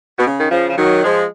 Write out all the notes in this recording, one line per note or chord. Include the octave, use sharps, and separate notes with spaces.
B2
C#3
D#3
C#3 F3
F3
D#3 F#3
F3 G#3